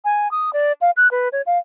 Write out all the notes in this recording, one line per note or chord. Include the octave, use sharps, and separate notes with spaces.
G#5
D#6
D5
F5
F#6
B4
C#5
F5